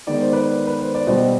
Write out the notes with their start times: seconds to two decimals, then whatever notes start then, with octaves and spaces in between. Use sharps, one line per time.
0.07 D#3 G#3 B3 D5
0.20 C5
0.32 B4 D5
0.67 B4
0.81 C5
0.94 D5
1.07 B2 G3 B3 C5 D#5